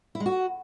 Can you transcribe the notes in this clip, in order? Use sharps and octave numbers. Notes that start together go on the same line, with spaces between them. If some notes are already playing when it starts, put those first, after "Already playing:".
E4
G#3
F#4